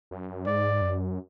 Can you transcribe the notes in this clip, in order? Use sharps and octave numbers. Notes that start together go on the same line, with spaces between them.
F#2
G#2 D5
F#2